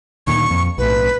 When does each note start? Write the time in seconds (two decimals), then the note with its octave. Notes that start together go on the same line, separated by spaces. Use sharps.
0.27 D2 A#2 D#3 C#6
0.51 F2
0.78 B1 A2 B4